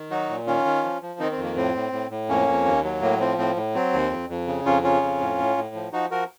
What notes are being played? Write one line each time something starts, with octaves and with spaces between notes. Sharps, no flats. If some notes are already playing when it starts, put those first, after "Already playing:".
Already playing: D#3
F#3 D#4 F#4
A#2
D#3 C#4 F4
D#3
F3
F3
D#3 C4 D#4
C4
F2
A#3
A2 C4
A2
A2
A2
F2 A#3 C#4
F2
D#2
F#3
A2 A#3
F3 C4
A2 C4
A2
F#3 C4
D#2
F2
F2
C#3
F2 C#4 F4
C#3 C#4 F4
F2
A2
A2
A2
F3
F3 D#4 F#4
F3 F#4 A#4